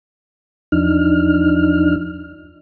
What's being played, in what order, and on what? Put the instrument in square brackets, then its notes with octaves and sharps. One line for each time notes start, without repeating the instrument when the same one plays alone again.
[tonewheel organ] E2 F3 D4 D#4 F6